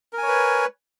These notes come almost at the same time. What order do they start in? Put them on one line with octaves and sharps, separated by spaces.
A#4 G#5 C#5 B4